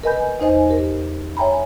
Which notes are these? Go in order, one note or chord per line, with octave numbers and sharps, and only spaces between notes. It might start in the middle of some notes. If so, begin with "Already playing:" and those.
A#4 B4 D#5 G#5 B5 G6
E2 D#4 C5 D#5 G#5
G4 A#4
C#5 E5 G5 G#5 A#5 B5